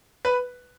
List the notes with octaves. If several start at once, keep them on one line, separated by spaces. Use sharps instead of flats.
B4